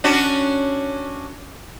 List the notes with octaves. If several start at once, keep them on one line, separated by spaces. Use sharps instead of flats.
C#4 D4 F#4